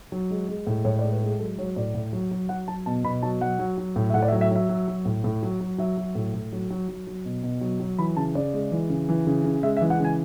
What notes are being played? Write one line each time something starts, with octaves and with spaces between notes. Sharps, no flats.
F#3
G#3
G#3
A2
A2 C#5
D5
G#3
B4
G#3 G#4
F#3 A4
F#3 C#5
A2 D5
A2
F#3
F#3
F#3 F#5
F#3 A5
B2 A5
B2 B5
F#3 A5
F#3 F#5
F#3
F#3
A2
E5
A2 F#5
D5
E5
F#3
E5
F#3 E5
F#3
F#3
A2
A2
F#3
F#3
F#3 E5
F#3
A2
A2
F#3
F#3
F#3
F#3
B2
B2
F#3
F#3
E3 B5
C#3 A5
C#3 D5
G#3
E3
C#3
E3
C#3
C#3
G#3 E5
E5
E3
F#5
C#3 G#5